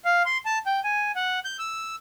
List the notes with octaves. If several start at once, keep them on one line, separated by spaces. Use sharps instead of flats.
F5
C6
A5
G5
G#5
F#5
G6
E6